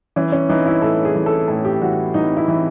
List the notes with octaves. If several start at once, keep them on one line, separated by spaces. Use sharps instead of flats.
E3 C#4
C#4
E3 D#4
E4
A2 A4
G#4
E3
A4
A2 A4
G4
E3 F#4
E3 D#4
E4
E3